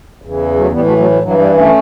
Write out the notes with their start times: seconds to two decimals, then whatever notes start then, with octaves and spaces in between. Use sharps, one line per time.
0.22 E2 C#3 E3
0.55 F#3 A3
0.72 A2 E3 G3 B3
0.85 F#3 A3
0.97 F#3 A3
1.10 F#3
1.22 G2 E3 F#3
1.39 G3
1.56 A3 C#4